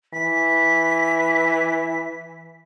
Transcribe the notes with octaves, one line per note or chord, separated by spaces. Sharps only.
E3 B6